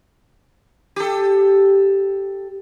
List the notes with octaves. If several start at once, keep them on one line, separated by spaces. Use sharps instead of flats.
G4 A4